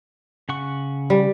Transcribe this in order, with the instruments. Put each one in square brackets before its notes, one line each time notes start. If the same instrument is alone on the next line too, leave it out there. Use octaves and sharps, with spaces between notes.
[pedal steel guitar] C#3 F#5 C#6
[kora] G3